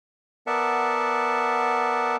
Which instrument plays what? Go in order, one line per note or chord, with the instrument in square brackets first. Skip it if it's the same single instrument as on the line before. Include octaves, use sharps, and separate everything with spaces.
[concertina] B3 A#4 D5 E5 F#5 A5